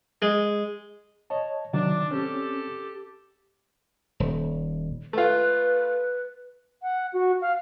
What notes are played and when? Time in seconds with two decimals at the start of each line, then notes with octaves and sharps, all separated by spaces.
0.22 G#3
1.30 C#5 D#5 A5
1.73 C3 D#3 F#3 D4
2.11 C4 C#4 G4 A4
4.20 D#1
5.13 A3 F4 B4
6.83 F#5
7.13 F#4
7.41 F5